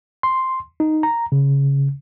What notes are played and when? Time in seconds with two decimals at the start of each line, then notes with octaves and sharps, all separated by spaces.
0.23 C6
0.80 D#4
1.03 A#5
1.32 C#3